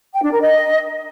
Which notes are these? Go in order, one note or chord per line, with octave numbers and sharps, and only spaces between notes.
G5
D4
A#4
D#5